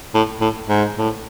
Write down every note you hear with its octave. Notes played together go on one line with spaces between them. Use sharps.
A2
A2
G#2
A2